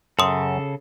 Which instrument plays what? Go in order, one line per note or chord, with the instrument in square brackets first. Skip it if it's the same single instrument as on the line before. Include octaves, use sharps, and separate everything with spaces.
[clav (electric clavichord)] F#2 [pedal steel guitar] C#3 A4 [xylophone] C6 D#6